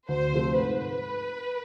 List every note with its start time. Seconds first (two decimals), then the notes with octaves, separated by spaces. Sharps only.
0.08 D2 C5
0.33 C3 F3 A3 C4
0.57 G#2 B4